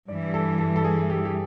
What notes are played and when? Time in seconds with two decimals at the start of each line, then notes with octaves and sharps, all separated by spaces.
0.08 G2 E3 G3 D5
0.34 A4
0.59 A4
0.76 A4
0.85 G#4
1.10 G4
1.25 G4